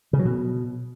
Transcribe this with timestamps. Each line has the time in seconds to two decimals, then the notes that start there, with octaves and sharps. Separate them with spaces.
0.13 C#3
0.19 F#3
0.25 B2